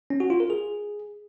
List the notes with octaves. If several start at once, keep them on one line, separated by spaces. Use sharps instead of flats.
C#4
F#4
F4
A#4
G#4